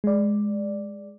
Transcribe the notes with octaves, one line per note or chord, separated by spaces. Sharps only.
G#3 D5